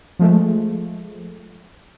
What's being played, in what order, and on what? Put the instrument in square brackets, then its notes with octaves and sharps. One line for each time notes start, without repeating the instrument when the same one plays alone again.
[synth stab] F3 G#3 A3